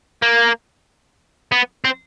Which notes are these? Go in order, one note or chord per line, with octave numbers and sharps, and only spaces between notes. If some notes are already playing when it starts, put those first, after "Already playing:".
A#3
B3
C4